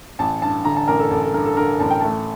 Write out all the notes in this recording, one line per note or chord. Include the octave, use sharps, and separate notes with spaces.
A1 A5
G2 A5
D3 A#5
A5
A1 A#4
A4
A1 A4
A4
G2 A#4
A4
D3 A#4
A1 A5
G5
A3 A5